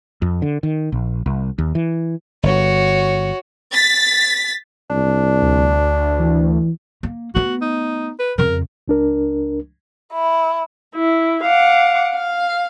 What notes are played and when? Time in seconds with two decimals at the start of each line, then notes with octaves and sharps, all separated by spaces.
0.22 F2
0.42 D3
0.63 D#3
0.92 A#1
1.26 C2
1.58 D#2
1.75 E3
2.43 G1 F#4 C#5
3.73 A6 B6
4.90 C2 D4
5.42 D2
6.20 E3
7.03 A#3
7.35 A3 B3 F#4
7.61 D#4
8.19 B4
8.38 F2 C#3 A#4
8.88 C#2 D4 A#4
10.13 E4
10.95 E4
11.43 F5 F#5 D6
12.12 F5